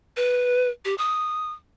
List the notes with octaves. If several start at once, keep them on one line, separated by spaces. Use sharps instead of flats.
B4
G4
D#6